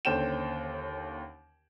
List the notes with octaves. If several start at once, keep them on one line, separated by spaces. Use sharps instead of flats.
D#2 D3 C#4 C5 G5 E7